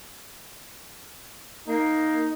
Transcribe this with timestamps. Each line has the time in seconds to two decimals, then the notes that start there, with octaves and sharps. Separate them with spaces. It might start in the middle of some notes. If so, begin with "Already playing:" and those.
1.68 A#3 D#4